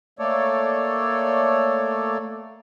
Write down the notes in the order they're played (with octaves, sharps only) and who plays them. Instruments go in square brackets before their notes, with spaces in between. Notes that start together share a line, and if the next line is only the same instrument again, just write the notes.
[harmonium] A3 A#3 A4 C#5 D5